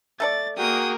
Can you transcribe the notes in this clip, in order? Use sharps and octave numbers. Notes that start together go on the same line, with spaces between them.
A3 A4 D5 A6
A#3 F#4 G#4 A#4 G5 D#6